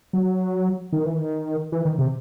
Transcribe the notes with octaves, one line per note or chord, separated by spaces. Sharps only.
F#3
D#3
E3
D#3
E3
D#3
C3